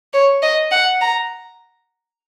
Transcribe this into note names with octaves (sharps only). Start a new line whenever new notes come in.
C#5
D#5
F#5
A#5